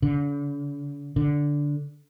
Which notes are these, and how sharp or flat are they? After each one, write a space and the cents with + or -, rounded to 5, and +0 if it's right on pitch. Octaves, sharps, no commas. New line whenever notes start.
D3 -40
D3 -10